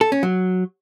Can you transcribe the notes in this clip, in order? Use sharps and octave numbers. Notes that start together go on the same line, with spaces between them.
A4
C#4
F#3